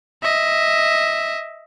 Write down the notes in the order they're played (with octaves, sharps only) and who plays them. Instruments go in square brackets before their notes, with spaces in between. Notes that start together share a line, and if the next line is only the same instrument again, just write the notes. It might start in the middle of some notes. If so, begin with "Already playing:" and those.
[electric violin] D#5 E5